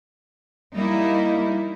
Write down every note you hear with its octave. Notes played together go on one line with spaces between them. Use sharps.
G3 A#3 D#4 E4